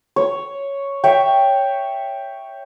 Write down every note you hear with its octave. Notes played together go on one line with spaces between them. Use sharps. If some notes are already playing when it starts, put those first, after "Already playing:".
C#5
C#5 E5 G5